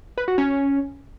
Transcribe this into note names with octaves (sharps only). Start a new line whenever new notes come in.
B4
F#4
C#4